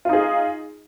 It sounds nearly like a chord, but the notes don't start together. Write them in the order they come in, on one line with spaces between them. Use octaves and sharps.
F4 D#4 G#4